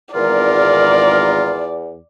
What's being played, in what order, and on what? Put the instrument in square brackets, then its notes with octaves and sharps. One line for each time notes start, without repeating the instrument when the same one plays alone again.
[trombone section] G#1 A#4 [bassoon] E2 [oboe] F4 [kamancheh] D5